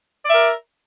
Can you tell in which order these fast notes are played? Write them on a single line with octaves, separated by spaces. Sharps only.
D5 E5 A#4